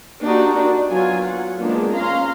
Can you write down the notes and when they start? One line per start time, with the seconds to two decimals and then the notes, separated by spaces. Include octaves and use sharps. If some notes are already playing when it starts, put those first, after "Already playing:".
0.21 A#3 D4 D#4 F#4 G4
0.56 D4
0.89 F#3 B3 F4 G#5
1.27 F#5
1.61 D#3 F3 G#3 A#3 B3 D4
1.95 C#4 F5 A#5 C6